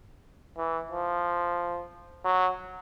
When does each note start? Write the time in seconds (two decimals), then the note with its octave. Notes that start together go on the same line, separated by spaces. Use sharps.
0.57 E3
0.91 F3
2.25 F#3